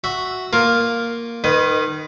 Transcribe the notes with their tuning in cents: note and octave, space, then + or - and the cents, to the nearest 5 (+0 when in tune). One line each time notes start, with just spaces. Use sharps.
F#4 +0 E5 +0
A#3 +0 F4 +0 A#4 +0
D#3 -20 B4 +20 D#5 +0